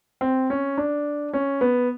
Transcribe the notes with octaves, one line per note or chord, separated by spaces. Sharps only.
C4
C#4
D4
C#4
B3